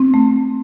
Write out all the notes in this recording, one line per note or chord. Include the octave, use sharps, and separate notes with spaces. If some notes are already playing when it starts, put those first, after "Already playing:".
Already playing: C4
A3